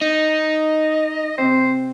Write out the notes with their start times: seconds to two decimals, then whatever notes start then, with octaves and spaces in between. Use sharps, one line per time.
0.02 D#4 D#5
1.38 C3 C4 C5